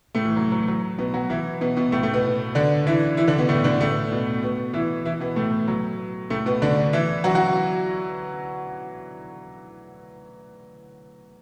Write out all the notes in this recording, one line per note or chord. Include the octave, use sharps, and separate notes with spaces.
A2 A3
E3
F#3
F#3
F#3
B2 B3
F#3 F#4
E3 E4
B2 B3
B2 B3
A2 A3
A2 A3
B2 B3
D3 D4
E3 E4
E3 E4
D3 D4
B2 B3
A2 A3
D3 D4
A2 A3
B2 B3
B2 B3
E3 E4
E3 E4
B2 B3
A2 A3
F#3
A2 A3
B2 B3
D3 D4
E3 E4
F#3 F#4
F#3 F#4